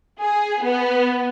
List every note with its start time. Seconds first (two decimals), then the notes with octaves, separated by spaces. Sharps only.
0.20 G#4
0.64 B3